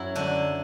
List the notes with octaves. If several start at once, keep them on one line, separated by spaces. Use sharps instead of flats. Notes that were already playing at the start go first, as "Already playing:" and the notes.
Already playing: F#2 F#3 E4
D3 D4